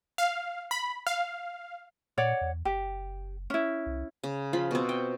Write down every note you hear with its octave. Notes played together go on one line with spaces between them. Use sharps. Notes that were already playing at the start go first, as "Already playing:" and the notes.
F5
B5
F5
A#2 C#5 D5 F#5
E2
F#1 G4
C#4 E4
C2
C#3
F3 F4 B5
B2 C4
G5